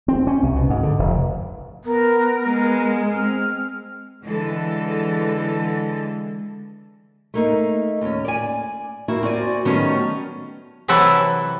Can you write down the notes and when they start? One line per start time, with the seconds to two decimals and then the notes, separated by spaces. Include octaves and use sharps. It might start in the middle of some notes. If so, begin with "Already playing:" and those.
0.08 C4
0.27 C#4
0.43 C2
0.56 B2
0.70 G#2
0.83 D3
0.99 F1
1.85 B3 A#4
2.46 G#3 B3
3.13 C4 F6
4.25 D3 E3 G#3 A4
7.34 A3 A#3 D#4
8.01 D#2 C#4
8.25 D5 G#5
9.08 A#3 E4 F#4
9.23 C4 F#4 D5 G#5
9.65 D#3 F#3 G3 A3 B3 C#4
10.88 C3 E3 F#3 E4 A4 B4